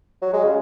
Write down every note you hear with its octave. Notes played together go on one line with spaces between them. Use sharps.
F#3
G#3
C#3